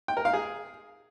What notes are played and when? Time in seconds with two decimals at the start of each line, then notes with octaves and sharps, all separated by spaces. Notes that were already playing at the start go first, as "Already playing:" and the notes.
0.08 G5
0.17 A#4
0.25 F5
0.33 G#4